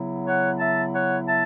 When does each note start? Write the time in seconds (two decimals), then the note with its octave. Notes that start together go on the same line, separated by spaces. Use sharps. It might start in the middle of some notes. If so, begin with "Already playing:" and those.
Already playing: C#3 F#3 B3 E4
0.24 C#5 F#5
0.58 E5 A5
0.92 C#5 F#5
1.26 E5 A5